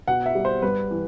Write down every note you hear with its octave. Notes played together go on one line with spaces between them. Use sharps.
B2 F#5
E5
G3
C5
G2 B4
E3